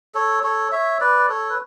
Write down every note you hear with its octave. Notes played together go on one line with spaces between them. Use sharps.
A4 C#5
A4 C#5
C#5 E5
B4 D5
A4 C#5
B4